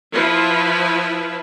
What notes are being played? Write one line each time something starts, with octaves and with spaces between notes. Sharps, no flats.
F3 E4 B4